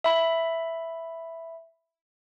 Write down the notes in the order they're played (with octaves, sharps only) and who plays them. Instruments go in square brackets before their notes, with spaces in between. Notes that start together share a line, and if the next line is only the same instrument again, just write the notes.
[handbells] E5 B5